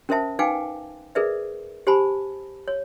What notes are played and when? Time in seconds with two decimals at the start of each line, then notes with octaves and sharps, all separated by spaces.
0.09 C#4 A#4 C5 E5 A5
0.39 D#4 B4 F5 G5 G#5 D6
1.15 G#4 A#4 B4 D5 E5
1.87 G4 C5 G#5 A5 B5
2.68 C#5